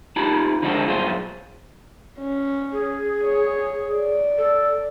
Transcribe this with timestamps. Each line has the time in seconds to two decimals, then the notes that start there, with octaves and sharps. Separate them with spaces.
0.16 D#4 F4 G4 A5 B5
0.62 D3 F3 G#3 C#4 F#4 A4
0.86 B1 G2 F4 G#4 C5
2.20 C#4
2.72 G#4
3.24 C#5
3.94 D5
4.38 A4